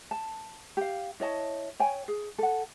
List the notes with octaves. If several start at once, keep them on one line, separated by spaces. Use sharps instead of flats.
A5
G4 F5
E4 C#5 D#5 A5
C#5 G5 G#5
G#4
A4 F#5